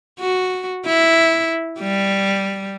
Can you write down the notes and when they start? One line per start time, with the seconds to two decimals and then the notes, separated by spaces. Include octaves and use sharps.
0.20 F#4
0.86 E4
1.80 G3